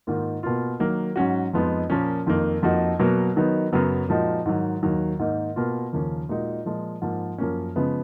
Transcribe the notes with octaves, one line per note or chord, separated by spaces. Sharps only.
G#2 D#3 A#3 F4
B2 A#3 F4
D#3 F#3 A#3
G#2 F#3 C#4 F#4
F2 F3 G#3 B3 D#4
A#2 F3 A#3 C#4
F2 D#3 A#3
F2 F3 A#3 D#4 F#4
B2 F#3 A#3
D#3 F#3 B3 D#4
F#2 C#3 F#3 B3
A#2 F3 G#3 D#4 F#4
G#2 D#3 F#3
D#2 D#3 F#3
G#2 D#3 A#3 D#4
B2 A#3 F4
D#2 C#3 F3 A#3 C#4
A#2 G#3 D#4 F#4
A#2 F3 G#3
G#2 F3 A#3
F#2 F3 A#3 C#4
C#3 F3 G#3 B3